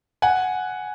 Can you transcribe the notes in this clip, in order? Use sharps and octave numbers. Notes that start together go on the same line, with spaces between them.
F#5 G#5